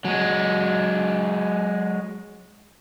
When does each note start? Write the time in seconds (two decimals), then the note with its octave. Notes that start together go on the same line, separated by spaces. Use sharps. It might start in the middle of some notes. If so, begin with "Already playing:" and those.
0.05 F#3 G#3